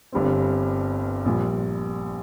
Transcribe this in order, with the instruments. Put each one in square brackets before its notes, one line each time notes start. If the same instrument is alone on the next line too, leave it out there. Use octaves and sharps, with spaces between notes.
[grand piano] G1 G2 G3 C4
A#1 A#2 G3